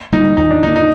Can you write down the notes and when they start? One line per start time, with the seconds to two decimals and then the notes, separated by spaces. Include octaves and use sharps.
0.12 D3 G3 A#3 D#4
0.37 D#2 D#4
0.51 D4
0.63 D3 G3 D#4
0.67 A#3
0.76 D#4